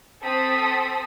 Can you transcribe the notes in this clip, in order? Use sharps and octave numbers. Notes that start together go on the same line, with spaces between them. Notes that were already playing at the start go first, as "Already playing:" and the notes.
C4 A4 C6 D#6 B6